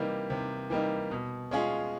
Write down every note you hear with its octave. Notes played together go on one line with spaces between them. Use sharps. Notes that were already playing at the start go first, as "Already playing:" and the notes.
Already playing: C3 E3 G3 A#3 D#4
C3
E3 G3 A#3 D#4
B2
G#3 C#4 F4 G#4